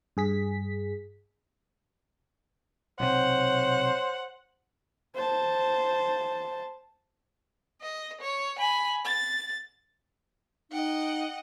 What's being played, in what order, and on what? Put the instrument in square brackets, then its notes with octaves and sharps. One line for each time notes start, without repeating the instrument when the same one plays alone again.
[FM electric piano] G2 G#4 B6
[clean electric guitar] B1 C3 [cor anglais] C5 [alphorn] C#5 [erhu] F#5
[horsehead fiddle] C5 A5
[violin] D#5
C#5
G#5 B5
A6
[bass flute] D#4 [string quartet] D#5 F#5 G5